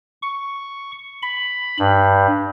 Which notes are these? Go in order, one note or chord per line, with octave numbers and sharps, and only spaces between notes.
C#6
B5
G2